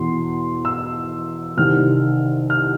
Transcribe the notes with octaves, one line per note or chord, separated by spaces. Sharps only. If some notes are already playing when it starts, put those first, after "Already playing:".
Already playing: E2 B2 C6
E6
C2 C3 D#3 F6
F6